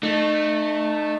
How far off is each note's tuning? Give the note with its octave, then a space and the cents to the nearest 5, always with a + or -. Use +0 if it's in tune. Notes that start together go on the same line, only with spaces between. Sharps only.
A3 +0 D#4 -35